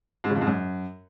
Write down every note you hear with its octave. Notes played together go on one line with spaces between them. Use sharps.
G#2
C#3
F2
G#2
F#2